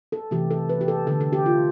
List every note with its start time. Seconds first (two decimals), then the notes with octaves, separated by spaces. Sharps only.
0.12 A4
0.31 C3 E3 A3 G4
0.51 A4
0.69 B4
0.81 G4
0.88 A4
1.07 D3 A3 A4
1.21 A4
1.33 G4
1.46 F4